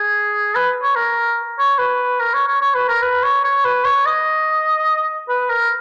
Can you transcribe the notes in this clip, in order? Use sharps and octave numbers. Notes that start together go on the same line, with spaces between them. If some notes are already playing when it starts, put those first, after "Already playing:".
Already playing: G#4
B4
C#5
A#4
C#5
B4
A#4
C#5
C#5
C#5
B4
A#4
B4
C#5
C#5
B4
C#5
D#5
B4
A#4